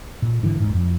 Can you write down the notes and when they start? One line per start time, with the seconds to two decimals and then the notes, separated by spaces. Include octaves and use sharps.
0.22 A#2
0.43 G#2 D3 E3
0.59 D#1 G#2
0.74 F2